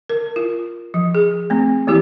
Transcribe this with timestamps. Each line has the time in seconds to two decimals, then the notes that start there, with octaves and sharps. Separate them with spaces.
0.09 A#4
0.36 F4
0.94 F3
1.15 G#4
1.50 A3 C4
1.87 E3 A#3 E4 G4